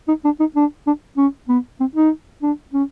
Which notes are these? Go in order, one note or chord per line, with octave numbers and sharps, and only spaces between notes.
D#4
D4
D#4
D4
D4
C#4
B3
C4
D#4
D4
C#4